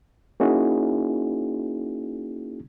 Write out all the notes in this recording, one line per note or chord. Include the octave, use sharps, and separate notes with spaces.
A#3 C#4 D#4 E4 F#4 G#4